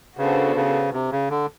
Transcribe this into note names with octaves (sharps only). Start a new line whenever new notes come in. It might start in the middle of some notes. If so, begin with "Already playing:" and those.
C#3 B3 D4 F#4 A4 C5
C#3
C3
C#3
D3